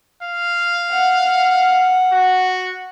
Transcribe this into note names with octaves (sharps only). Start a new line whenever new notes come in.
F5
F#5
F#4